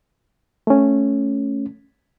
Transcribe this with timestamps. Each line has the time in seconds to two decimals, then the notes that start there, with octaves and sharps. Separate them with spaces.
0.67 A3 C#4